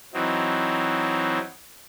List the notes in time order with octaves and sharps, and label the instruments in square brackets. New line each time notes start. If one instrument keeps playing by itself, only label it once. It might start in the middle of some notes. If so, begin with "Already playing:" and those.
[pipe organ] E3 F#3 C4 D#4